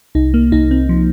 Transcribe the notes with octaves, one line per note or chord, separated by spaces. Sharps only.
C2 D#4
A#3
C2 D#4
C4
F3